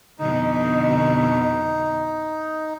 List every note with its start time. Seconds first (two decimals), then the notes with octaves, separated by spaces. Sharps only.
0.19 F2 B2 D3 D#4